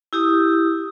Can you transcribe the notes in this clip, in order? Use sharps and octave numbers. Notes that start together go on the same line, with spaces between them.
E4 G4 D#6